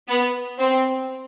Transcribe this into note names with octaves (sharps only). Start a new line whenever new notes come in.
B3
C4